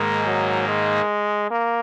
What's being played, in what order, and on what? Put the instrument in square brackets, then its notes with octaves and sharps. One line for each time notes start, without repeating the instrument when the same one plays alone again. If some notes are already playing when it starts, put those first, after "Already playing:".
Already playing: [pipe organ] G#2 D#3 A#3 [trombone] G#3
[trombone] F#3
G#3
A#3